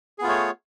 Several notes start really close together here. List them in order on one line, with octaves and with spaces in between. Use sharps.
G#4 B3 F4 A3 C#5